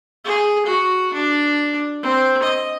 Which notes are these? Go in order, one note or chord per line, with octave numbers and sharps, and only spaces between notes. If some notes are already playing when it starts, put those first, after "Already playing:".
G#4
F#4
D4
C4
D#5